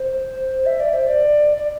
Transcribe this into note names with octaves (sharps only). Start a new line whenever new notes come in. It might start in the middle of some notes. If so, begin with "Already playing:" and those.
Already playing: C5
E5
D5
C5
D5
D5